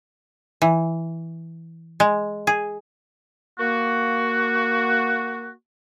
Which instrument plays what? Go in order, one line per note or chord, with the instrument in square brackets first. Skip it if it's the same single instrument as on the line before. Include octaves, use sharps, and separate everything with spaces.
[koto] E3
G#3
G#4
[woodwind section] A#3 F#4